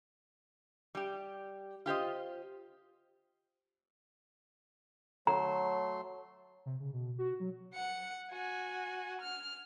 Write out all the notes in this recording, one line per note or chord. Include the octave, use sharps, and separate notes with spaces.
G3 G4
F4 G4 C5 D#5
F#3 A3 A#5 C6
C3
C#3
B2
F#4
F#3
F#5 C#7
F#4 G#5
F6